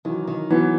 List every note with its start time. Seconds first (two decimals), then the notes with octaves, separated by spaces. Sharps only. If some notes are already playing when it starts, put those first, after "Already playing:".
0.05 D#3 E3 F#3
0.27 D#3
0.50 E3 F#3 B3